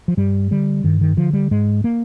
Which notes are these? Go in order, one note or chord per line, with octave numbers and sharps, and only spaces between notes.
F3
G2 G3
D3 G3
G2 D#3
D#3
D3 F3
G3
G#2 G#3
A#3